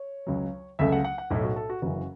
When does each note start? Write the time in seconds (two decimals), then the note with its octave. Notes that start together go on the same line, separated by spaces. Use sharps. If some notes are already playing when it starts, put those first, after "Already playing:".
Already playing: C#5
0.27 C#2 C#3 F#3
0.79 C#2 C#3 F#3 A3 E5
0.92 F#5
1.04 F#5
1.18 F#5
1.30 B1 A2 A3 E4
1.44 F#4
1.56 A4
1.70 F#4
1.82 F#1 F#2 C#3 E3 F#4